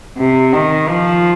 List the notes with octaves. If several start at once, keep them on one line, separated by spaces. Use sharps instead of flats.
C3
D#3
F3